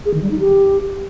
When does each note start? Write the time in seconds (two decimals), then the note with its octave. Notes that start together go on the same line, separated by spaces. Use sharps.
0.05 G#4
0.14 D#3
0.22 G3
0.31 D#4
0.39 G4